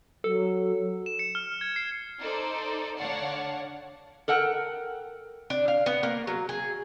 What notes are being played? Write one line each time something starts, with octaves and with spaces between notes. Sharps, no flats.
F#3 A4
E7
C#7
F6
G#6
C7
D#4 A4 C5 D5
D3 C#5 D5 F5 F#5 A5
A4 A#4 F#5 G5
D4
F5
B3
A#3
F#3
G#4